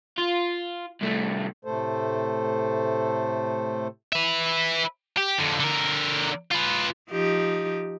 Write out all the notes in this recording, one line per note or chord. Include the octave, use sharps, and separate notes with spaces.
F4
C2 A3
A2 C3 A3 A4 C5
B4 E5
G4
F2 D3
D3 A#4
F4 B4
F3 D#4 G4